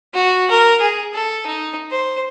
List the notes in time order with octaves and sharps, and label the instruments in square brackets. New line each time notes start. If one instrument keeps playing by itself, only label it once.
[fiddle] F#4
A#4
G#4
A4
D#4
C5